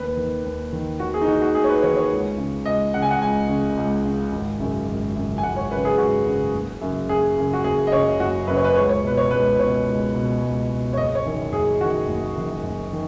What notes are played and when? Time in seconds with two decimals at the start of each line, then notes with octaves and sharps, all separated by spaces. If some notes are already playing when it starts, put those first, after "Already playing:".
Already playing: D#2 B4
0.17 D#3
0.44 D#2
0.72 D#3
1.00 D#2 F#4
1.14 G#4
1.22 D#4
1.27 D#3 F#4
1.42 F#4
1.55 D#2 G#4
1.64 C#5
1.69 B4
1.83 D#3 C#5
1.96 C#5
2.11 C#2
2.38 C#3
2.65 C#2 D#5
2.94 C#3 F#5
3.02 G#5
3.11 F#5
3.21 C#2 G#5
3.49 C#3
3.77 C#2
4.05 C#3
4.32 G#1
4.59 F#2 C#3
4.88 G#1
5.16 F#2 C#3
5.38 G#5
5.43 G#1 F#5
5.56 C#5
5.70 F#2 B4
5.76 C#3
5.85 G#4
5.98 G#1 F#4
6.26 F#2 C#3
6.54 F#1
6.81 F#2 C#3
7.09 F#1 G#4
7.37 F#2 C#3
7.53 F#4
7.64 F#1 G#4
7.87 D#5
7.92 F#2 C#3 C#5
8.20 F#1 F#4
8.47 F#2 C#3 B4
8.56 C#5
8.64 B4
8.75 C#2 C#5
8.89 C#5
9.04 B2 B4
9.17 C#5
9.31 C#2 B4
9.59 B2 C#5
9.87 C#2
10.14 B2
10.41 C#2
10.70 B2
10.93 C#5
10.97 F#1 D#5
11.15 C#5
11.24 F#2 D#3
11.52 F#1 G#4
11.81 F#2 D#3 F#4
12.08 F#1
12.35 F#2 D#3
12.63 F#1
12.93 D#3